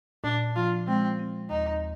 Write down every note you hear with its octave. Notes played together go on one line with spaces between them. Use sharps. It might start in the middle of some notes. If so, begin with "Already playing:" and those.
A#2 D4
F3 F4
G#3 C4
C4
D#2 D#4